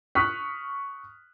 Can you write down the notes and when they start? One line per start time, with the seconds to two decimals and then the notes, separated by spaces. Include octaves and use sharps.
0.15 C#6 D#6 F6 F#6 B6